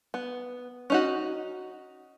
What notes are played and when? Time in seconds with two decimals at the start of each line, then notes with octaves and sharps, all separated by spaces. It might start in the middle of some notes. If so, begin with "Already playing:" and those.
0.14 B3
0.90 C#4 D#4 F#4